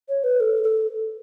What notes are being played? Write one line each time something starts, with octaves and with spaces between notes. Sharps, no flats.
C#5
B4
A4
A4